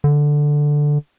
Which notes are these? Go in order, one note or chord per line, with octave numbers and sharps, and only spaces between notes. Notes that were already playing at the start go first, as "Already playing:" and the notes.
D3